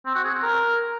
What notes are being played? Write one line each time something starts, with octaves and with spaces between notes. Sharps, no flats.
C4
F#4
G#4
C4
A#4